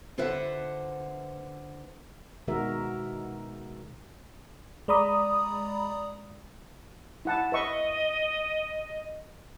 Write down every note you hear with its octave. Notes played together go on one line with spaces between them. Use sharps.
D3 F4 B4 C5 E5 F#5
B2 D#3 G#3 F#4 A#4 E5
G#3 D5 A#5 B5 D#6
E4 F#5 A5
B4 D#5 E5 C#6